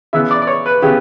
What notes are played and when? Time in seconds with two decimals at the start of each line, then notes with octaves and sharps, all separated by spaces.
0.13 C#3 E3 B3 E4 E5
0.31 D5
0.42 D5
0.47 C#5
0.66 B4
0.82 C#3 E3 B3 G4